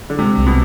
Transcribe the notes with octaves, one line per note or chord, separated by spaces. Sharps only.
D3
C3 G#3
C2
B2